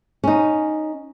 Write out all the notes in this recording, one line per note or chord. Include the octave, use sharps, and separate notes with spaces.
C#4 D#4